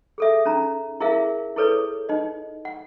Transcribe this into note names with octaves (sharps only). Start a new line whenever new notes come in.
G#4 A4 E5
C#4 D#4 A#5
E4 G#4 A#4 E5 F5
E4 G#4 A4 B4 C#5
D#4 D#5
F#5